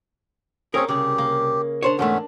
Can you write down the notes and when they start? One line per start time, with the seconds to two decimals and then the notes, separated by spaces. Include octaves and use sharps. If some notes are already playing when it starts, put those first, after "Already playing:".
0.74 A#3 C4 C#4 G#4 A#4 C#5
0.88 C2 C#3 G4 G#4
1.18 A#3
1.83 D4 C5 C#5
1.99 E2 G#2 A3 B3 C#4 D4